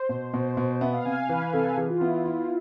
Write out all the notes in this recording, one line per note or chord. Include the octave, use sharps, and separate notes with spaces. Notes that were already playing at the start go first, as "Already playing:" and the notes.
Already playing: C5
B2
B2
B2
B3 E5
F5
C3 G#5
F5
E3 B4
C3 A4
E3 G#4
F4
B3 E4
E4 F4